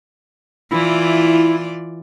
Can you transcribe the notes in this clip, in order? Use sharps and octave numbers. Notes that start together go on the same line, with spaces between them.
E3 E4 F4 D5